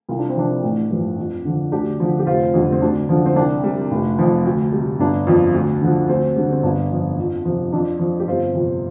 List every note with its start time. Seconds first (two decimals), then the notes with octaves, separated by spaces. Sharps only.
0.09 C2 F4
0.19 D4
0.29 C4
0.36 C3 F3 D4
0.63 A1
0.91 G2 F3
1.17 F2
1.45 D3 F3
1.72 D2 D4 G4
2.00 D3 F3
2.19 G4
2.26 F1 C4 F4
2.54 F2 D3 G3
2.72 C4
2.81 D2 D4
3.09 D3 F3
3.25 C4
3.36 C2 D4
3.63 C3 G3
3.91 F1
4.19 F2 F3
4.45 D2
4.72 C3 G3
4.99 G1 D4
5.27 F2 F3
5.54 D2
5.81 D3 F3
6.09 D2 C4
6.36 D3 G3
6.52 C4
6.63 G1 D4
6.91 F2 F3
7.18 F2
7.45 C3 F3
7.72 F2 D4
7.99 F3
8.20 G4
8.27 G1 C4 F4
8.55 F2 C3